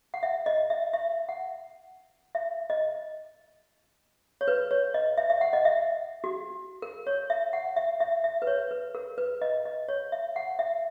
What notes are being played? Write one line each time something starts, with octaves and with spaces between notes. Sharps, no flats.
F#5
E5
D#5
E5
E5
F#5
E5
D#5
C#5
B4
C#5
D#5
E5
E5
F#5
D#5
E5
F#4
A#4
C#5
E5
F#5
E5
E5
E5
B4
C#5
B4
A#4
B4
D#5
D#5
C#5
E5
F#5
E5